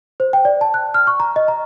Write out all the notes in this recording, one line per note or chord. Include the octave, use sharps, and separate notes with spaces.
C5
G5
D5
A5
F#6
F6
C#6
A#5
D#5
A#5